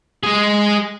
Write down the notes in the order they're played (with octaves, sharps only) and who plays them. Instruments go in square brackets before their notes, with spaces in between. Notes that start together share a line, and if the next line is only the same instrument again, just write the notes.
[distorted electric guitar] G#3 G#4